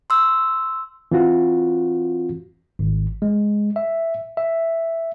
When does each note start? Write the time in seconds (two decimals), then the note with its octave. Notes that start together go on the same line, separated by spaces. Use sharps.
0.10 C6 E6
1.11 E3 C4 F4 F#4
2.79 G#1
3.22 G#3
3.76 E5
4.37 E5